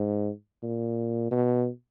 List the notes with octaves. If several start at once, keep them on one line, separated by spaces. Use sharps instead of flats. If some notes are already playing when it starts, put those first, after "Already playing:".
Already playing: G#2
A#2
B2